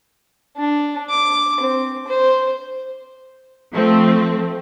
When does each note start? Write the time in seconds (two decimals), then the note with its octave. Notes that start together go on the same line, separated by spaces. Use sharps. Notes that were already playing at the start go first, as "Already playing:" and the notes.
0.57 D4
1.10 D6
1.60 C4
2.07 C5
3.73 F3 A3 C4